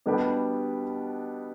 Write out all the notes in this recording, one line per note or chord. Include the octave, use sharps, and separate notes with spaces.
B2 G3 B3 D4 G4